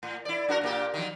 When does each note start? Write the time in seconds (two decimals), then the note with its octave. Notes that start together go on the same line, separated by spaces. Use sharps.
0.03 A2
0.25 E4 D5
0.48 D4 F#4 A#4
0.61 A#2 A#3 G4
0.94 D#3 F3